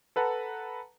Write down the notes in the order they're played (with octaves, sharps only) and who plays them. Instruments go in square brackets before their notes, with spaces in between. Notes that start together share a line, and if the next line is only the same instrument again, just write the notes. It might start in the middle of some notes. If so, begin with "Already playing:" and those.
[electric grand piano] A4 B4 F#5 A5 A#5